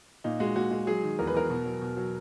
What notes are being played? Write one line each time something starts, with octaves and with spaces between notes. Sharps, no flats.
A#2 D#4
G#3 F#4
A#2 F#4
G#3
F#3 G#4
D#3
E2 A#4
B4
E2 A#4
B2
F#3
B2
F#3